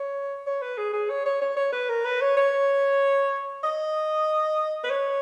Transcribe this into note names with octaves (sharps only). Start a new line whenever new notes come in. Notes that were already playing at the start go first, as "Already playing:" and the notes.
Already playing: C#5
C#5
B4
G#4
G#4
C#5
C#5
C#5
C#5
B4
A#4
B4
C#5
C#5
D#5
B4
C#5